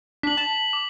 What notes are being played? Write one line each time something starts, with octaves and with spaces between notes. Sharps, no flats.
D4 B6 F#7
A5
D6